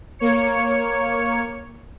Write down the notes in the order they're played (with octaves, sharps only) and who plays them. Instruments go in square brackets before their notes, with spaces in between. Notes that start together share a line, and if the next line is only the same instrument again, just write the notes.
[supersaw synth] A#3 C#5 C#7